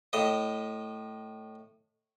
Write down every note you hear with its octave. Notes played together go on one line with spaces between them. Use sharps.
A2 D#5